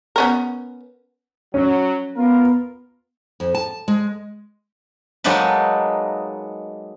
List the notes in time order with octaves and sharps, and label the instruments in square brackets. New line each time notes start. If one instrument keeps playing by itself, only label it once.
[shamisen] B3 C#4 A#4
[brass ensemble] F#3 [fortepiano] C#4
[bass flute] B3 [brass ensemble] F4 A#4
[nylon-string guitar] F2
A5
G#3
[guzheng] F#3 G#3 A#3 D#4 A4 B4